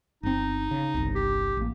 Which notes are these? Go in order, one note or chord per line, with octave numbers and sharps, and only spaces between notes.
G1 C4 D#4
C#3
G1 C2
G4
A1 A#3